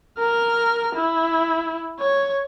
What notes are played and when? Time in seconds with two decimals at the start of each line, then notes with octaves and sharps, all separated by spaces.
0.19 A#4 F6
0.95 E4
2.00 C#5